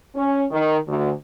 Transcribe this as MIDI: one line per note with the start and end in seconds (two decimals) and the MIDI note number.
0.16 0.46 61
0.51 0.78 51
0.88 1.11 38